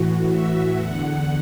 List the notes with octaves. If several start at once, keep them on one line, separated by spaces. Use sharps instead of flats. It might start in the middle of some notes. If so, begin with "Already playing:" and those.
Already playing: A2 E3 F#4
E5
E2 D3 F#5